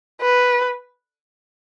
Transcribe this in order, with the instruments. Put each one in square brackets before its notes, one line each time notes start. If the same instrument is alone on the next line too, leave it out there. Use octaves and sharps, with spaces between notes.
[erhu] B4